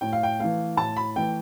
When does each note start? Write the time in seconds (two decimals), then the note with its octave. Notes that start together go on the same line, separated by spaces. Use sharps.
0.01 A2 G5
0.13 F5
0.23 G5
0.39 E3 A3 F5
0.77 A2 A5
0.97 B5
1.16 E3 A3 G5